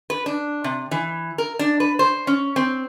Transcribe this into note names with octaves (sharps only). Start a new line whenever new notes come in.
B4
D4
C3
E3
A#4
D4
B4
C5
C#4
C4